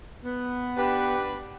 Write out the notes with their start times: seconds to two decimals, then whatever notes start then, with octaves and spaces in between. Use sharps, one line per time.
0.24 B3
0.77 D4 G4 B4